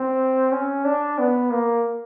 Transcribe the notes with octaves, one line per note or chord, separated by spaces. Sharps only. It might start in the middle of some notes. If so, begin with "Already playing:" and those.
Already playing: C4
C#4
D4
B3
A#3